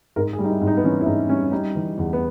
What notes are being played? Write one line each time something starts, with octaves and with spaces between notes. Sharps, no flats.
G#2 A#4
G#4
G3
D#4
E4
G#2
D#4
B3
E3 C#4
E4
G#2 D#4
G3 C#4
G3 D#4
E3
E2
B3